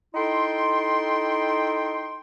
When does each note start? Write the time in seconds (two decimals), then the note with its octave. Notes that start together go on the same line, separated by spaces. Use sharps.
0.15 D#4 E4 A4 G5 C6